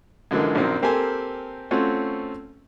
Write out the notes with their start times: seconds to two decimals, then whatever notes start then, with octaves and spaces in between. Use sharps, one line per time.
0.31 F#2 D3 E3 F3 G#3 A#3
0.55 A#1 F#2 D#3 A#3 C4
0.82 A#3 C4 G4 A4 A#4 G#5
1.71 A3 C4 C#4 F4 F#4